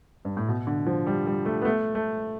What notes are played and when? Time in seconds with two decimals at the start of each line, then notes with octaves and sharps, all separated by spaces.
0.25 G2
0.37 A2
0.48 B2
0.67 D3
0.87 F3
1.06 G3
1.27 G3
1.45 A3
1.62 B3
1.65 A3
1.95 A3